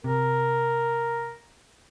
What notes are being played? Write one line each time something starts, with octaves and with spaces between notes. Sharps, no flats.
C3 A#4